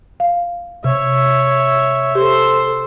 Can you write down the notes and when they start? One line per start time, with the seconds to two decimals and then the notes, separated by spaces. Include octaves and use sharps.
0.20 F5
0.84 C3 C#5 E5
2.15 G4 A4 C5